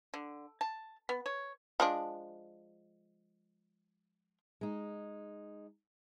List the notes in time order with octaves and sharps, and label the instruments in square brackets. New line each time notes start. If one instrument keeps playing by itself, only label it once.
[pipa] D3
A5
B3
C#5
[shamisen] F3 G#3 D4
[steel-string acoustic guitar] G#3 D#4